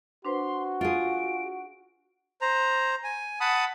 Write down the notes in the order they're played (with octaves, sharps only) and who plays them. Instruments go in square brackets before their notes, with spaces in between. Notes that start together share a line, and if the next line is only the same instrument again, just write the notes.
[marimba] D4 B4 C5 [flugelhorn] F#4 [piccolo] C6
[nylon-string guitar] F4 G#4 [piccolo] D7
[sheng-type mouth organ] C5 A#5
G#5
F#5 A5 B5 D#6